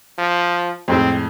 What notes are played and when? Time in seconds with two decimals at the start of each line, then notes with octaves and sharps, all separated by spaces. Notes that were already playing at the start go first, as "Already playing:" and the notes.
0.18 F3
0.88 F2 A2 G#3 C4